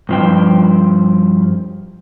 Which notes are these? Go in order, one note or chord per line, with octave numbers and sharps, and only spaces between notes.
G2 F3 G5